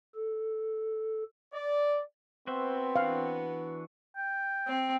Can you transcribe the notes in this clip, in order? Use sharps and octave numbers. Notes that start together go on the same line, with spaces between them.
A4
D5
B3 C4 F#4 C5 E5
E3 D4 F#4 F5
G5
C4